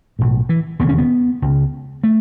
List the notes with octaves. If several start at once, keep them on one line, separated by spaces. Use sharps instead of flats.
B1 A2
E3
E1 D#2 C#3 B3
C#4
B3
C#2 C#3
A3